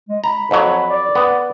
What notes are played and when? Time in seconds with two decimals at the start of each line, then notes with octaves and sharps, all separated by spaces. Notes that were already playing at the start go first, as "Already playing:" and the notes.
0.08 G#3
0.24 A#5 B5
0.51 F2 F#3
0.90 D5
1.15 B3